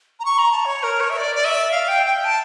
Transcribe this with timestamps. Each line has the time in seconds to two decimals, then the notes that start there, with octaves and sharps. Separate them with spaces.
0.20 A#5
0.25 C#6
0.38 A#5
0.52 A5
0.65 C#5
0.83 A#4
1.00 C#5
1.10 E5
1.18 D5
1.35 D5
1.45 E5
1.71 F5
1.88 G5
2.06 G5
2.25 A5